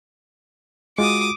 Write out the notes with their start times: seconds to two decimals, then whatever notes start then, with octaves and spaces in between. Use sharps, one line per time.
0.99 G#3 F4 F#4 D6 D#6